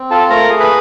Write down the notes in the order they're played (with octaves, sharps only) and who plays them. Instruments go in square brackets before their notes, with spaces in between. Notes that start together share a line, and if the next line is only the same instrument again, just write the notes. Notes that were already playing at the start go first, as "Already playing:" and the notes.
Already playing: [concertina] C4
F4 A4 A5
A3 A#4 A#5
G#4
B4 B5